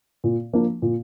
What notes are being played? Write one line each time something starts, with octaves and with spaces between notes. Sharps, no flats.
A#2
F3 A#3 D4
A#2